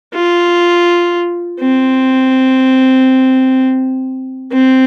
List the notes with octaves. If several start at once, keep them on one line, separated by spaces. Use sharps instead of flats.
F4
C4
C4